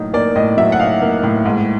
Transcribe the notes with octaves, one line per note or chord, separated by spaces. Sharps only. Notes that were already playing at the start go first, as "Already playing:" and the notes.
Already playing: A2 F#3 A#3 D#4
A#3 D5
A2 D#5
F#3 E5
F#5
D#4 F5
A#3
A2
G#2